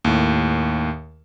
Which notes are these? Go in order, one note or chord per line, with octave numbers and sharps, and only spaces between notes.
D#2 A2